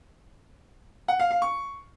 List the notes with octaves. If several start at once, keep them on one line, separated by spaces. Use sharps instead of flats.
F#5
F5
F5
C#6